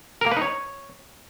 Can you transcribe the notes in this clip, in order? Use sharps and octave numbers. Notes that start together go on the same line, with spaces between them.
A#4
A#3
B4
D#4
C#5